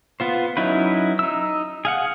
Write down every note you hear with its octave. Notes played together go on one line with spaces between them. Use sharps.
B3 F4 C5
F#3 C#4 D#4 E4 B4
D#4 E6
G#4 F5 F#5